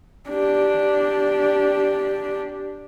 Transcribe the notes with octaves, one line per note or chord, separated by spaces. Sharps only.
D4 G4